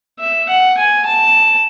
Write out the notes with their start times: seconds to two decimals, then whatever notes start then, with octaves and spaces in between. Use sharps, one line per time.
0.20 E5
0.49 F#5
0.77 G#5
1.06 A5